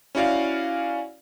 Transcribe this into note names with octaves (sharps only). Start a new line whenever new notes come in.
C#4 E4 F#4 D5 F5